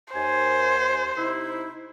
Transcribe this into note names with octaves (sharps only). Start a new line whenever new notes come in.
D#2 C5 G#5
C3 D#4 E4